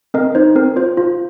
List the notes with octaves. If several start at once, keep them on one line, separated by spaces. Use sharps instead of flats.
C4 A#4 D#5
D#4 C5
C4 A#4
F4 C5
F4